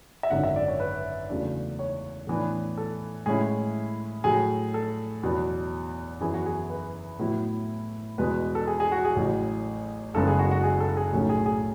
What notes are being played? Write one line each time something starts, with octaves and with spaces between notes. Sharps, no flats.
E5
G#1 F#2 D3 F#5
E5
D5
C#5
B4
E2 C#3 F#3 A3 D4
C#5
A2 E3 B3 D4
A4
A2 G#3 C#4 E4 G#4
A2 F#3 A3 G#4
A4
E2 B2 F#3 B3
F#2 E3 B3 E4 G#4
F#4
G#4
B4
A2 F#3 B3 E4
E2 B2 G#3 B4
A4
G#4
G#4
F#4
G#4
A1 A2 F#3
F#1 F#2 C#3 G#3 B3 A4
G#4
F#4
F#4
G#4
A4
G#4
B1 A2 F#3 A3 C#4
G#4
G#4